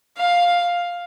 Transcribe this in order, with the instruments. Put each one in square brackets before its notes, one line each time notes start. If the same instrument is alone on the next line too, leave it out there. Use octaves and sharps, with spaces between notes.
[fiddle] F5